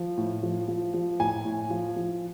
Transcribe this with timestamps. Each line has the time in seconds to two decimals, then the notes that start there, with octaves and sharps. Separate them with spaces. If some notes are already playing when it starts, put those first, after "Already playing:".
Already playing: F3
0.17 A2
0.43 F3
0.68 F3
0.94 F3
1.20 A2 G#5
1.45 A2
1.70 F3
1.96 F3